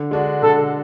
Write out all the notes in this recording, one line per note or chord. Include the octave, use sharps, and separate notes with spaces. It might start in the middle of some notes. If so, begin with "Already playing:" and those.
Already playing: D3
G#3 D4 F#4
D3 A4